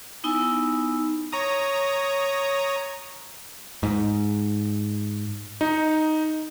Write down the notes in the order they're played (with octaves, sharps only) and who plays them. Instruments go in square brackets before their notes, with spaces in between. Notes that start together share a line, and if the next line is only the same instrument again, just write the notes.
[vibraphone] B3 D#4 E4 G#5 E6
[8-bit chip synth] C#5 A#5 D#6
[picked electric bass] G#2
[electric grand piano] D#4